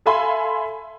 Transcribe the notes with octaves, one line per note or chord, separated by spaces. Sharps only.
A4 E5 F5 G#5 B5 C6